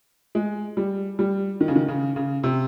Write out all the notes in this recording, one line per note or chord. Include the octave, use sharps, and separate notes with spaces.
G#3
G3
G3
D#3
C#3
D#3
C#3
C#3
C3